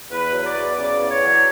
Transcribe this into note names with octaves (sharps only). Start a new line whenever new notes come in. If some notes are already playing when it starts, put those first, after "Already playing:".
E2 B4
F#3
D5
E2
C#3 D5
E2
C#5
F#3